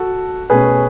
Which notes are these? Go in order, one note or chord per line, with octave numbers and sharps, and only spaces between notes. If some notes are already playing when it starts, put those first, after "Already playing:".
Already playing: F#4 A4
B2 A3 C#4 G#4 B4